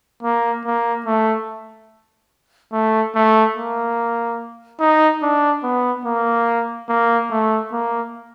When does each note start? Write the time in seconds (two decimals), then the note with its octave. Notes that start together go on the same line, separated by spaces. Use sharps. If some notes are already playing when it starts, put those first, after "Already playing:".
0.23 A#3
0.65 A#3
1.06 A3
2.72 A3
3.15 A3
3.56 A#3
4.80 D#4
5.22 D4
5.63 B3
6.05 A#3
6.89 A#3
7.31 A3
7.72 A#3